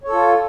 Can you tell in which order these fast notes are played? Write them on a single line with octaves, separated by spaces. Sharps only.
C#5 A4 F4